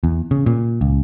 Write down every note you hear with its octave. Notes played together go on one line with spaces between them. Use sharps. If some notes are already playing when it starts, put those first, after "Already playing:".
E2
C#3
A#2
C#2